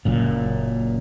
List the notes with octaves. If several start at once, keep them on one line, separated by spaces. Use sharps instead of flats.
F#1 F#2 A#2